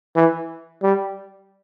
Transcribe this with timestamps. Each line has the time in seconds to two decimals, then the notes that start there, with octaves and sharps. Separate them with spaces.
0.16 E3
0.83 G3